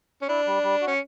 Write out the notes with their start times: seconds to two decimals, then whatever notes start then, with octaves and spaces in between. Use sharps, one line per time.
0.22 C#4
0.29 D4 E4
0.47 G3
0.63 G3
0.81 F#4
0.87 C#4